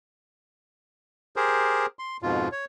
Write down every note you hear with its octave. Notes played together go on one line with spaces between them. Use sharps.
G4 G#4 A#4 C5
C6
F2 G#2 B2 F4
C#5